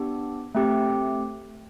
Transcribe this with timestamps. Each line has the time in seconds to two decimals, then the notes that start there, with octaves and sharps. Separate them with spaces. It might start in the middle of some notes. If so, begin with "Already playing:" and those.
Already playing: B3 D4 G4
0.55 A3 C4 G4